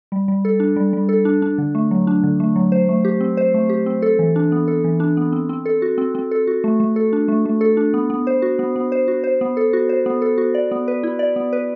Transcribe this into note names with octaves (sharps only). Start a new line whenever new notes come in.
G3
G3
A4
D4
G3
G3
A4
D4
D4
D3
A3
F#3
D4
D3
A3
F#3
C5
A3
G4
C4
C5
A3
G4
C4
A4
E3
D4
B3
A4
E3
D4
B3
C4
C4
A4
F#4
C4
C4
A4
F#4
A3
A3
A4
D4
A3
A3
A4
D4
B3
B3
C5
F#4
B3
B3
C5
F#4
C5
B3
A4
F#4
C5
B3
A4
F#4
D5
B3
B4
E4
D5
B3
B4